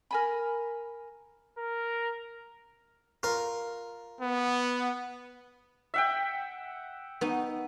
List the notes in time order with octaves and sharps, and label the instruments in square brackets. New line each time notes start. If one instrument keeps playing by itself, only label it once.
[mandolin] A#4 G#5 B5
[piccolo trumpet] A#4
[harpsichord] F4 A#4
[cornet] B3
[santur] E5 F#5 G5
[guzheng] B3 D#4